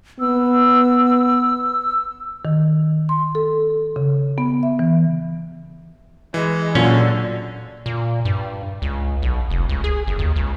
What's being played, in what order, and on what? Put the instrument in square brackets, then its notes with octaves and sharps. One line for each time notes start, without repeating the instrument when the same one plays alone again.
[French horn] B3 [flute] E6
[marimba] D#3
C6
A4
C#3
B3
E5
E3
[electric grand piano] E3 [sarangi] G#3
[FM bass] A#2 [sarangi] D3 [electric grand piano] F#3 F4 [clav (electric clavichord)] C#4
[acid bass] A#2
G2
C#2
B1
F1
C#2
G#4
G1
D#2
C#2